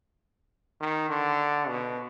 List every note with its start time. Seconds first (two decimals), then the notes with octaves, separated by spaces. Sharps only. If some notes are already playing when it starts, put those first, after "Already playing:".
0.81 D#3
1.09 D3
1.68 B2